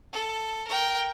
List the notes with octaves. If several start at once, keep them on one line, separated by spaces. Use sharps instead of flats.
A4
A#4 G5